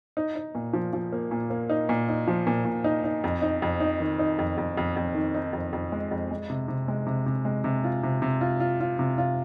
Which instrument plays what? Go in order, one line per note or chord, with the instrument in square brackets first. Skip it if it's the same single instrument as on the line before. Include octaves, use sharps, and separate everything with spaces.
[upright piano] D#4
D#4
A#2
F3
F3
A#3
A#2
A#3
D#4
A#2
D#4
F3
A#2
A#2
D#4
D#4
F2
D#4
F2
D#4
D#3
D#4
F2
F2
F2
F2
D#3
D#4
F2
F2
G#3
F2
G#3
C3
C3
G#3
C3
C3
G#3
C3
F4
C3
C3
F4
F4
F4
C3
F4